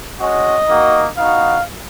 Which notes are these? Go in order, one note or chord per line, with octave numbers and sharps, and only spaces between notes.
G#3 C#4 F#4 D#5
A#3 D#4 F#4
B3 D#4 F#4 F5